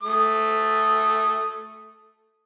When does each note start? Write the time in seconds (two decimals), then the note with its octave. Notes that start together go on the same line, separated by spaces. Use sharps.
0.03 A3 D#6